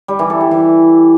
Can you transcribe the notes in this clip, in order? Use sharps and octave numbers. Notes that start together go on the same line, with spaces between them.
G3
E3
A4
G4
E3